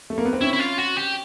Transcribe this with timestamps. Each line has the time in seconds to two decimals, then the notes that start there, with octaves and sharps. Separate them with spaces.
0.10 A3
0.18 A#3
0.25 B3
0.33 C4
0.41 C#4 E4
0.53 E4
0.59 F4
0.78 F#4
0.96 G4